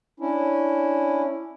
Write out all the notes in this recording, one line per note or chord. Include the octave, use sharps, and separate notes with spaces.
C#4 D4 E4